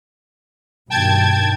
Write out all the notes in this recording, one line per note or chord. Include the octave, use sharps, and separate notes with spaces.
G2 B2 D#3 G5 A5 G#6